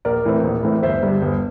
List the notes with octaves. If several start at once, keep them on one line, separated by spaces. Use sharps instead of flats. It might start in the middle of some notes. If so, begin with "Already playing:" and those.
A#1 A#4 D5
A2 E3 A3 C4
A#1
A2 E3 A3 C4
G1 C5 E5
G2 D3 G3
G1